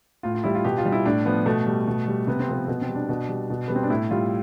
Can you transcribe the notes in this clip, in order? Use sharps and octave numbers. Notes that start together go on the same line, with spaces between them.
A2 F4
F4
G3 E4
F4
B2 G4
F4
G3
E4
A2 D4
F3 B3
B2 A3
G3
B2
G3
C3 B3
C4
F3 B3
B2 B3
C4
G3
D4
B2
G3
B2
G3 B3
C4
D4
A2 E4
G3 F4